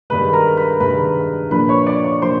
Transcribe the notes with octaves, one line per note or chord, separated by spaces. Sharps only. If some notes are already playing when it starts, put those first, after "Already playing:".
G2 D#3 G#3 B4 B5
A#4 A#5
B4 B5
G2 D#3 G#3 B4 B5
A#2 F3 A#3 D4 B4 B5
C#5 C#6
D5 D6
C#5 C#6
A#2 F3 A#3 D4 C5 C6